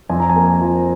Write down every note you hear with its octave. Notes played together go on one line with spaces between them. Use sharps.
F2 G#5
A#5
G#5
A#3
F3